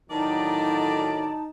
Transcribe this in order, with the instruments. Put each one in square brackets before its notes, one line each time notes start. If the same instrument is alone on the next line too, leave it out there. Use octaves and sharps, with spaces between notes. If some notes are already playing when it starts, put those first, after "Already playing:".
[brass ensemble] A2 D3 F#3 [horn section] D#3 D5 [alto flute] D#4 [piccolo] A5